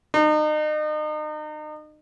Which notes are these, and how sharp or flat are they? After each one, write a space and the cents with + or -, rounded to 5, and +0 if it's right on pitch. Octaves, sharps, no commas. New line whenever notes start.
D#4 -35